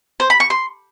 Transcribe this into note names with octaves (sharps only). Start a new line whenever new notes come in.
C5
B5
C#6
C6